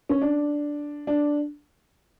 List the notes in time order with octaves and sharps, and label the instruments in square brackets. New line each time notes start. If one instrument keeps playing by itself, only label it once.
[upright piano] C#4
D4
D4